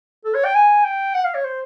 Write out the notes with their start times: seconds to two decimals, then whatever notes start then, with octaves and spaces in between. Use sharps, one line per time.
0.25 A4
0.34 C#5
0.44 G5
0.54 G#5
0.84 G5
1.14 F#5
1.24 F5
1.34 C#5
1.44 C5